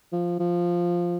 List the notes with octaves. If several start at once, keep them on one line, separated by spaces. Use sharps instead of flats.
F3
F3